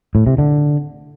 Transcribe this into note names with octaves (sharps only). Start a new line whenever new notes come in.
A2
C3
D3